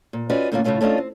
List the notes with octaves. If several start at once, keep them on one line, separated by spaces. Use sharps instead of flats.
A#2
C#4 F4 F#4 B4 D5 D#5
A2 D3 A#3 C#4 D#4 F4
A2 C#3 F#3 A3 C#4 F4
A3 C#4 D4 F4 D#5
C4